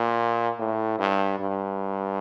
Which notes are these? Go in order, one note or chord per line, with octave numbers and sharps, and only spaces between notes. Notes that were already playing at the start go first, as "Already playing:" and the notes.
Already playing: A#2
A2
G2
G2